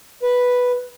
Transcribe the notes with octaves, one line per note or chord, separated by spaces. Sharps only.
B4